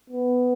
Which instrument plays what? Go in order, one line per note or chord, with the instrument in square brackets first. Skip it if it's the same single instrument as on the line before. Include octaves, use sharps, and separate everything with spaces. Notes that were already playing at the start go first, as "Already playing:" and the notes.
[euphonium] B3